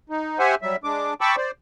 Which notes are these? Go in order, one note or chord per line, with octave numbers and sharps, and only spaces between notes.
D#4
G4 C5 E5 F#5 G#5
F#3 G3 E5
G#3 D4 D6
G5 A5 B5 C#6 D6 E6
C5 D5